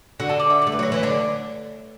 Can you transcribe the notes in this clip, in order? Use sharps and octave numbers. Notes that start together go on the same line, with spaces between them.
D3 F#4
A4
D5
E5
D5
A3
B4
F#3 F#4
E3 E4
D3 D4